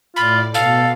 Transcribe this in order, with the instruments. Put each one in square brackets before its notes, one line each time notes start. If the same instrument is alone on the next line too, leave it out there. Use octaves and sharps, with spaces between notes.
[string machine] A2 D5 [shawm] F4 [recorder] B5
[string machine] B2 [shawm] A4 [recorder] F5